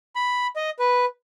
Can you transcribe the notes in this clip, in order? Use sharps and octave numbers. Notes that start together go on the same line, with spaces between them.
B5
D#5
B4